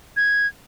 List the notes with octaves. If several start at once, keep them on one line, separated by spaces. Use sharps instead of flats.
G#6